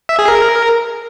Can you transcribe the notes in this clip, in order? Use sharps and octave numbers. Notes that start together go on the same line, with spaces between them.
E5
G#4
A#4